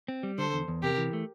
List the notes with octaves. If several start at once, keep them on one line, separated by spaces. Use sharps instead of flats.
C4
G3
D3 A4 C5
E2
E2
C3 G4 A#4
E3
A3